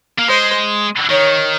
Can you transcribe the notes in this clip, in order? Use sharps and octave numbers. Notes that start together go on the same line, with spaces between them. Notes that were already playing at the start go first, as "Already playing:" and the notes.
A#3
G#3 C5
D#3 C#5